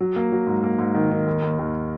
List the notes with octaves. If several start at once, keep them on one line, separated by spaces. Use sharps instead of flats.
F#3
A#3
F#3
G#2
A#3
G#2
D#3
D#3
D#2
D#2
D#2